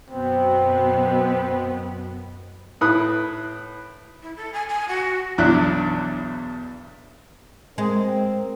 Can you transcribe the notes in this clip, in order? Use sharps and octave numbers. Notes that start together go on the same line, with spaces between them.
F#2 B2 B3 C4
A2 B4 D#6 F#6
E4
A4
G#5
G#5
F#4
B1 E2 D4 E4 F#6
G#3 C4 A#4